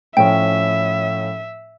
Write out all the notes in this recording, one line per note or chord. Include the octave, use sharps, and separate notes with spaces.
A2 F3 C#4 E5 G5